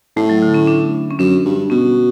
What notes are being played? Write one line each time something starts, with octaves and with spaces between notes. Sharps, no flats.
A2 A3
F#3
D3
C#4
D4
C#4
F#2 D4
G2
B2 C#4